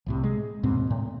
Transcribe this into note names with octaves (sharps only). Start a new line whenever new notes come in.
C2 A2 C3
G#3
D#2 G#2 B2 C4
A2